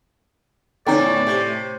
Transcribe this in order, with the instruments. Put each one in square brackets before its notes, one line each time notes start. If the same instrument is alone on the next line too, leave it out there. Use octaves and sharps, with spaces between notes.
[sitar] E2 C#4 [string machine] A2 A3 [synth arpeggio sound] D3 C4 D#4 [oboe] D5
[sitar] C3